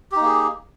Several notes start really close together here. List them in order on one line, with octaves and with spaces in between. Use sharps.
G4 D#4 A#3 G#4